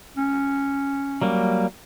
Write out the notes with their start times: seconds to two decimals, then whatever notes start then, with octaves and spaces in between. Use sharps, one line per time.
0.17 C#4
1.21 F#3 G3 A#3